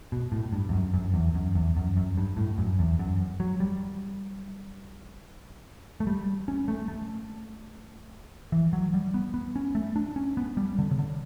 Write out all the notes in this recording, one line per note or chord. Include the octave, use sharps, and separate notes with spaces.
B2
A2
G2
E2
F#2
F#2
E2
F#2
E2
F#2
F#2
G2
A2
F#2
E2
F#2
F#3
G3
A3
G3
C#4
A3
A3
E3
F#3
G3
B3
B3
C#4
A3
D4
C#4
B3
G3
D3
C#3
D3